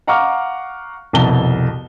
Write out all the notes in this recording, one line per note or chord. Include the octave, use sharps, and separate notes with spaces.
F5 F#5 A#5 C#6 D6 F6
C2 F2 B2 A5 G7